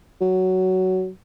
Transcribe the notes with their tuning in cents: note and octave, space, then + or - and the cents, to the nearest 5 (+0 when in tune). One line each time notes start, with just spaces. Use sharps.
F#3 +10